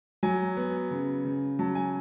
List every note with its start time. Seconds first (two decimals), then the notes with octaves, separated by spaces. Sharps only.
0.23 F#3 G#5
0.57 B3
0.91 C#3
1.25 C#3
1.59 F#3 A5
1.75 G#5